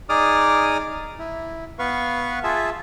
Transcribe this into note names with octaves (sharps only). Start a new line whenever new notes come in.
D#4 G#4 D5 D6 D#6 F6
E4
B3 B4 F5 C#6
F4 G#4 E5 A5